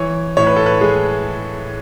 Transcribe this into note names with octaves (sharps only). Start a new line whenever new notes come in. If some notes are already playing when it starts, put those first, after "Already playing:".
Already playing: E3 C#5
A2 C#5
B4
A4
B4
G#3 G#4